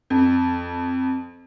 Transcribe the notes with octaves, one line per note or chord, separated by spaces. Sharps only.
F2